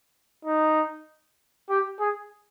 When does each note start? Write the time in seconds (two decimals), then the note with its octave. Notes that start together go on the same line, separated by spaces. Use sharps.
0.45 D#4
1.70 G4
2.00 G#4